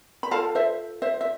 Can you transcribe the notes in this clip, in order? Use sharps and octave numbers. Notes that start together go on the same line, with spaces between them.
B5
F4 A4 F5 A5
C5 E5
C5 E5
E5